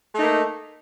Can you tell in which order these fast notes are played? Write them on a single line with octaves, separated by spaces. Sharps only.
A3 D#4 A#3